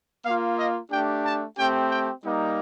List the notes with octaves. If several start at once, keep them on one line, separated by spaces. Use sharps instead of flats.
A#3 F4 F5
D#5
A3 D4 G4 G5
A5
A3 C4 G4 G5
G5
G3 A#3 D#4